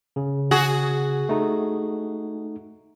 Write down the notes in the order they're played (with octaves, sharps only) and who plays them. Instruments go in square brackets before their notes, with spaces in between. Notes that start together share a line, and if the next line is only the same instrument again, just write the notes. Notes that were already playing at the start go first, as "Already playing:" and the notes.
[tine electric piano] C#3
[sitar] F#4 G#4
[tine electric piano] A3 D#4